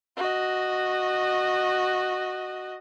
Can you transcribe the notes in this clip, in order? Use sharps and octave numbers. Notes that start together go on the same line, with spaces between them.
F#4 D#5